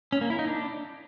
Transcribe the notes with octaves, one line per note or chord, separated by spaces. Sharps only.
C#4
A#3
E4
D#4
D4